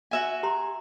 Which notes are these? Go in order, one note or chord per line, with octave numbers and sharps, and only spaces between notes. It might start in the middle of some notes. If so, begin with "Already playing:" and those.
F#4 E5 G#5
G4 A#5 C6